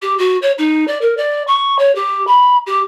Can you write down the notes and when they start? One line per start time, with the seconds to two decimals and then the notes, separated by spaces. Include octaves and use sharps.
0.02 G4
0.18 F#4
0.42 C#5
0.58 D#4
0.87 D5
1.01 A#4
1.17 D5
1.47 C#6
1.78 C#5
1.95 G4
2.27 B5
2.66 G4